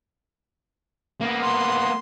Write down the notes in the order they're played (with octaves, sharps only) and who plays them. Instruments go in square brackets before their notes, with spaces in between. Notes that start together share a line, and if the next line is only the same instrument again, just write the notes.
[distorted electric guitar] A#3 B3
[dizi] C6